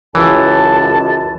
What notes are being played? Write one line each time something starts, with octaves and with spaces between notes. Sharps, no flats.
C#2 F#2 E3 A5